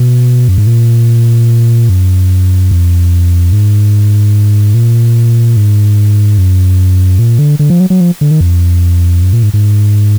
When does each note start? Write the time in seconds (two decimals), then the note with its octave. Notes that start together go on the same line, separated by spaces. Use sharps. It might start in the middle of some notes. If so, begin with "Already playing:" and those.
Already playing: B2
0.48 F#2
0.58 G#2
0.67 A#2
1.89 F#2
2.71 F2
3.53 G#2
4.74 A#2
5.57 G#2
6.38 F#2
7.19 A#2
7.39 D3
7.59 D3
7.70 F3
7.80 F#3
7.90 F#3
8.01 F3
8.21 D3
8.31 D#3
8.41 F2
9.22 F#2
9.33 A#2
9.43 G#2
9.54 G#2